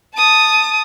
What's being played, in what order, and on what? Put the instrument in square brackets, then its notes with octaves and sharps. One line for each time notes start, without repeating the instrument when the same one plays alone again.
[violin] A5 D#6